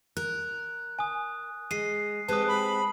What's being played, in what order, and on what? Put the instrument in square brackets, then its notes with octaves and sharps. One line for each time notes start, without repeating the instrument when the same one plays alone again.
[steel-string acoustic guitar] A#4 [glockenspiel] F#6
[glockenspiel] G#5 D#6
[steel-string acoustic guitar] G#3 [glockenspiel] C7 D#7
[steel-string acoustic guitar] G#3 C4 G4 [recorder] B4 [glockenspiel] A5 D#6
[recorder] B5